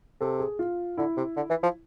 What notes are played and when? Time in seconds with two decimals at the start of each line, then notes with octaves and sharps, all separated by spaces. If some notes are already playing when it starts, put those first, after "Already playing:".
0.21 C3 A4
0.40 G#4
0.59 F4
0.98 D3 E4
1.17 C3
1.36 D3
1.50 E3
1.63 F3